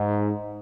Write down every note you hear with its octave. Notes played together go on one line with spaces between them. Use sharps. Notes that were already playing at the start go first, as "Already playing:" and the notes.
Already playing: G#2